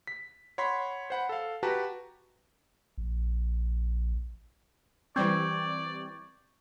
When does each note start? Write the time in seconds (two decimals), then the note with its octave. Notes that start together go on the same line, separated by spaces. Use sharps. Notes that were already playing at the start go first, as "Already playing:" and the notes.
0.07 B6
0.58 C#5 F#5 B5 C6 B6
1.10 C5 F#5 B5
1.29 A4 F5
1.63 F#4 G4 B4 A5 A#5
2.98 A#1
5.16 E3 G3 C4 D5 C#6 G6 G#6